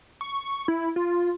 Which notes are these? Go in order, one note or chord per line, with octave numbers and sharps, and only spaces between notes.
C#6
E4
F4